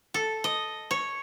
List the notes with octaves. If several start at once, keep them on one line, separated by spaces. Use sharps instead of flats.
A4
D#5
C#5